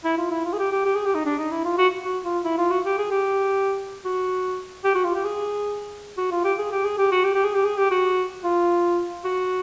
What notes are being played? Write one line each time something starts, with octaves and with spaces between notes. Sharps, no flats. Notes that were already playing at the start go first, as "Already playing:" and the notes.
E4
F4
E4
F4
G#4
G4
G4
G4
G#4
G4
D#4
D4
D#4
E4
F4
F#4
F#4
F4
E4
F4
F#4
G4
G#4
G4
F#4
G4
F#4
F4
G4
G#4
F#4
F4
G4
G#4
G4
G#4
G4
F#4
G4
G4
G#4
G4
G#4
G4
F#4
F4
F#4